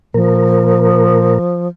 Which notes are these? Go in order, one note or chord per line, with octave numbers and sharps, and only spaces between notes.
A#2 F3 A#4